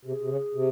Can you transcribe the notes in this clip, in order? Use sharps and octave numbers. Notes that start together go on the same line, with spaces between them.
C3 G#4
C3
C#3
C3